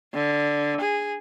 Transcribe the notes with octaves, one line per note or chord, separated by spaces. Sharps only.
D3
G#4